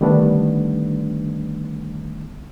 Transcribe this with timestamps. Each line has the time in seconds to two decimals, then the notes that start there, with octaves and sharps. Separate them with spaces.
0.01 D3 D#3 G3 A3 B3 D4